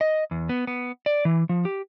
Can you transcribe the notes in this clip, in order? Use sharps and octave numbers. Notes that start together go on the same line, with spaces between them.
D#5
E2
B3
B3
D5
E3
F3
G4